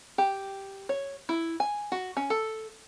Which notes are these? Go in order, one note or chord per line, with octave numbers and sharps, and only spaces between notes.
G4
C#5
E4
G#5
F#4
C#4
A4